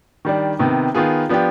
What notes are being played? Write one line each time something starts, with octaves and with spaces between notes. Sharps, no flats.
D#3 G3 D4
C3 D#3 B3
D#3 B3 F4 G#4
F3 B3 D4 G4